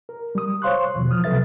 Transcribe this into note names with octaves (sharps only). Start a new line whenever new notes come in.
A#4
G3 D#6
C5 C#5 F5 C6 C#6 F#6
E2 B2 D#3 F3
E3 F3 D#6 F6
C3 F#3 A4 B4 E5 A6